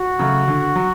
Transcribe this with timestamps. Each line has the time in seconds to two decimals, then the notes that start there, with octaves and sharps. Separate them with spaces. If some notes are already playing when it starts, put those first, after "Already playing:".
Already playing: F#4
0.19 C#3 F#3 A3
0.48 D3
0.76 F#3